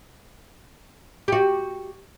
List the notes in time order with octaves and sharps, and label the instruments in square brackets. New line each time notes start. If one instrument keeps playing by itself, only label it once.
[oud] F#4 G4